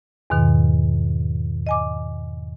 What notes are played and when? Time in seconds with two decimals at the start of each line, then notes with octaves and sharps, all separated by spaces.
0.30 E2 G#2 B2 D#3
1.67 D#5 G#5 D6